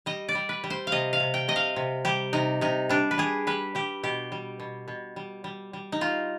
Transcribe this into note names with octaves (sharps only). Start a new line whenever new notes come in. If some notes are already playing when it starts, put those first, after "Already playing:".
G3 D#5
D5
G3
B4
G3
C5
F5
C3 D#5
F5
C3
G5
C3 D#5
F5
C3
G3 G4
C3 D#4
C3 D#4
G3 D4
B4
G3 G#4
G3 B4
G3 G4
B2 G4
G3
B2
B2
G3
G3
G3
D#4
G3 F4